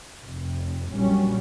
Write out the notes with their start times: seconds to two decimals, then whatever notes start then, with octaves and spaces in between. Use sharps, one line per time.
0.21 F1
0.90 A#1 F#3 G3 C#4